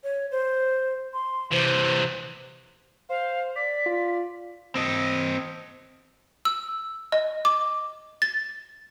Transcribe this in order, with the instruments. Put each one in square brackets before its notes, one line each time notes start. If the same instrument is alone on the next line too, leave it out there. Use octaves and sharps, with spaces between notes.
[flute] C#5
C5
C6
[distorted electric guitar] C3 E3 [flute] C5
[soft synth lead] C5 [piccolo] F5
[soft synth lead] D5 [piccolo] B6
[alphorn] F4
[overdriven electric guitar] C4 D#5
[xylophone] E6
D#5
D6
A6